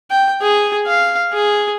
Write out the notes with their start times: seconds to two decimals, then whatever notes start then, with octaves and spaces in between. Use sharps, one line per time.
0.10 G5
0.42 G#4
0.87 F5
1.33 G#4